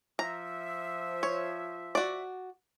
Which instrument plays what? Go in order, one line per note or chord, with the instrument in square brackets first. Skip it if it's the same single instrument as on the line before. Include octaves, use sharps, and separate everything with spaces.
[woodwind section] F3 E5 [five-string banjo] A#5
[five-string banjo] C#5
F#4 D5